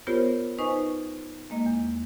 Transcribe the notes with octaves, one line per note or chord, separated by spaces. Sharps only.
B3 F4 G4 A#4 C5 C#5
D#4 B4 C5 D#5 G#5 C#6
G#3 A#3 D#5
E2